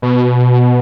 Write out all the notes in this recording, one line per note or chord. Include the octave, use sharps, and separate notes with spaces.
B2